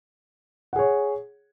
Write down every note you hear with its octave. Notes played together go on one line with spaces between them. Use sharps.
G#4 C#5 F#5